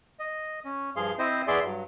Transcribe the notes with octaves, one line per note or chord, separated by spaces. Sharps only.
D#5
C#4
G2 F3 G#4 F5 C6
C4 E4 C5 D#5
E2 B3 G#4 D5 E5 C6
G2 F#3